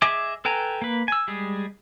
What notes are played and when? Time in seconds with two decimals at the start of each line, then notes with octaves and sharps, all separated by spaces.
0.02 G#4 D#5 E5 G#5 D6
0.45 A4 B4 G5 G#5 A#5
0.82 A#3 B4
1.08 G#5 E6
1.28 G3 G#3 G#4